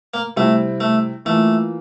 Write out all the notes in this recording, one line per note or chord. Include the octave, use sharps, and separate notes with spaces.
A#3
C3 G3 A3 C4 E4
A3
E3 A3 A#3 F4